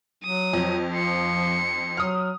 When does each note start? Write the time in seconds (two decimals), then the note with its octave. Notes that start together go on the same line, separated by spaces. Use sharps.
0.24 F#3 D#6
0.53 F2
0.92 F3 C6 C#7
1.97 F#3 D#6 F6